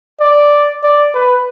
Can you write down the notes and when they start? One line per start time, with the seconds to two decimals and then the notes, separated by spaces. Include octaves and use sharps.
0.20 D5
0.83 D5
1.14 B4